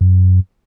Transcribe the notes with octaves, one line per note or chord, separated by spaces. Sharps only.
F#2